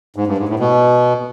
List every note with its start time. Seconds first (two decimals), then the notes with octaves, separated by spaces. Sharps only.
0.16 G#2
0.27 G2
0.38 G#2
0.49 A2
0.59 B2